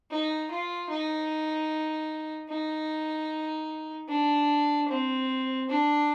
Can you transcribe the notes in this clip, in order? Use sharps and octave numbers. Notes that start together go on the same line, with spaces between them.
D#4
F4
D#4
D#4
D4
C4
D4